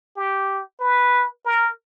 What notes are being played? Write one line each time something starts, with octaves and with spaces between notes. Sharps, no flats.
G4
B4
A#4